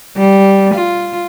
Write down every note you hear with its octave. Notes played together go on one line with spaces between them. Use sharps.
G3
F4